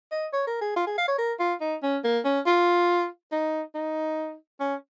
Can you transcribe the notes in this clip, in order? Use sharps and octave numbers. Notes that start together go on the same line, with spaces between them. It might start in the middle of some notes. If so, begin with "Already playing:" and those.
D#5
C#5
A#4
G#4
F4
G#4
F5
C#5
A#4
F4
D#4
C#4
A#3
C#4
F4
D#4
D#4
C#4